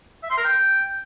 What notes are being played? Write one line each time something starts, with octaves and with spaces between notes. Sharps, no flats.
E5
C6
A#4
G5